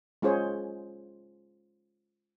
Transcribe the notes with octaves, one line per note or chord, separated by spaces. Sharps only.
G#3 C#4 F4 G#4 C5 C#5